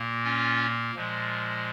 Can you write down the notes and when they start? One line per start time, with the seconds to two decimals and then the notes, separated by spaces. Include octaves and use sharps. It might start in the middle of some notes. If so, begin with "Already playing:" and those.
Already playing: A#2 A#3
0.24 C#4 F4
0.95 A#2 F3 G#3